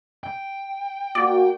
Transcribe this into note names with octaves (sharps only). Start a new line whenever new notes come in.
G5
A#3 F#4 D5